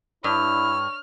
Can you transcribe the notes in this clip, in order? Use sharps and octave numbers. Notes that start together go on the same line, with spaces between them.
G2 E4 C#5 F6